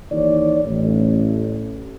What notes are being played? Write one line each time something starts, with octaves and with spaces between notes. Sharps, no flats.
D#2 D#3 E3 D#4 C#5 D5
A1